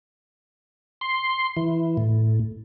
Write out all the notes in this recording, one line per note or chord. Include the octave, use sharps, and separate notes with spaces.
C6
E3
A2